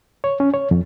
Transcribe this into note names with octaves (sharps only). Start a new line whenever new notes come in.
C#5
C#4
C#5
F2